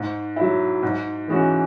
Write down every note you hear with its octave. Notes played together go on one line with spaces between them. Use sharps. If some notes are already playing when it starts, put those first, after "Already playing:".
Already playing: G#2
F#3 E4
G#2
E3 G#3 C#4 F#4